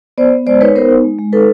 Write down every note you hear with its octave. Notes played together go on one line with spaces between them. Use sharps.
B3 C5 D5
B3
G#3 C5 D5
D#4 B4 C#5
B3 A#4 C5
D#4
G#3
G#3
D#4 A4 B4